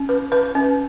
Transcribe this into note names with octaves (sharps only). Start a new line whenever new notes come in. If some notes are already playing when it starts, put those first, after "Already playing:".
Already playing: C#4
B4
B4
C#4